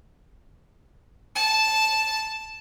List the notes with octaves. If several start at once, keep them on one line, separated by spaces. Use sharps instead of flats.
A5